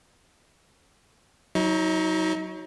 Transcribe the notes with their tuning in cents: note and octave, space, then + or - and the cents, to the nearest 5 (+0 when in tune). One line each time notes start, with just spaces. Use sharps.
F#3 +0 D#4 +35